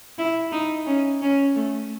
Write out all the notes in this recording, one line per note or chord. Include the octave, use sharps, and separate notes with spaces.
E4
D#4
C#4
C#4
A3